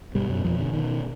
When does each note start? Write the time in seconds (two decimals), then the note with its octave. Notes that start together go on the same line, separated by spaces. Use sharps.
0.15 G2 B2 G3
0.30 F#2 F#3
0.44 F2 B2 F3
0.60 D3
0.73 B2 D#3